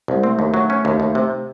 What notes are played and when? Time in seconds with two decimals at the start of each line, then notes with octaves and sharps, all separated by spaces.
0.08 C2
0.14 G#3
0.23 A3 C4
0.39 D#2
0.54 F#3
0.70 C#4
0.85 D#2
1.00 D#2
1.15 C3